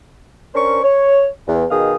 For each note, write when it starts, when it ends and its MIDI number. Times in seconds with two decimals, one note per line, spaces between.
0.55 0.80 61
0.55 0.80 62
0.55 0.80 70
0.55 0.80 72
0.55 0.80 85
0.84 1.27 73
1.48 1.65 40
1.71 1.96 47
1.71 1.96 51
1.71 1.96 68
1.71 1.96 77
1.71 1.96 87